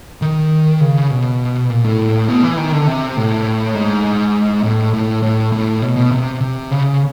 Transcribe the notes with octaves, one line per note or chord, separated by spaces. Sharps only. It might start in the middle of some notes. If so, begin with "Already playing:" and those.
D#3
C#3
B2
A#2
A2
B2
E3
D#3
D3
C3
A2
G#2
A2
A2
A2
A2
B2
B2
C3
C3
C#3